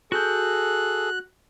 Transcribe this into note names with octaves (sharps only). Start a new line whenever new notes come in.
F#4 G#4 A4 F#6 G6